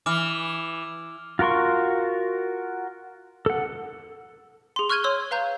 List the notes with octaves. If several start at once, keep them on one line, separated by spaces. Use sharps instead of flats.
E3 D6 F6
F4 F#4 A#4 C6 C#6
A4 F#5
G#4 C6
C#6 F6 F#6 G#6 D#7 G7
C#5 C6 E6
B4 F5 A#5 G6